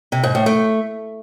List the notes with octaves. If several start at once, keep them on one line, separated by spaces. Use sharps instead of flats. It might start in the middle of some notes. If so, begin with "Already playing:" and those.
C3
G#2
A2
A3